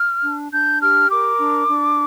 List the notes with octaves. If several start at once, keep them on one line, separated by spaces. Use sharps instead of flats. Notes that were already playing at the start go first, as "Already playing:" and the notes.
Already playing: F6
D4
D4 G6
G4 F6
A#4 D6
D4
D4